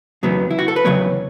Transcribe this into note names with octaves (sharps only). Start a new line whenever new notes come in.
E2 C#3 F#3 B3
E4
F#4
A4
B4
E2 C#3 F#3 B3 C#5